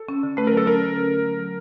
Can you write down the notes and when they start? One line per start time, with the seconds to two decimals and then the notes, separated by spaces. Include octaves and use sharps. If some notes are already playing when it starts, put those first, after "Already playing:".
Already playing: A4
0.09 C#4
0.23 D3
0.37 A3 B4
0.47 F#3 A#4
0.57 A4
0.66 C#4 A#4
0.81 D3
0.96 C#4
1.10 A3
1.25 F#3
1.39 F#3